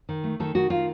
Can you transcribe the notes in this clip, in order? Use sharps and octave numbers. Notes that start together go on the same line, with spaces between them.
D#3
A3
D#3 A4
D#3 F#4
D#3 F4